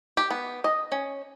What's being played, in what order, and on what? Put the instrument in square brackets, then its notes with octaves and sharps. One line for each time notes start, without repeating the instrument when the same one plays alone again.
[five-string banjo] G4
B3
D#5
C#4